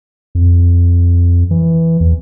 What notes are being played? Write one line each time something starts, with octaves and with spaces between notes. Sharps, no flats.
F2
E3
E2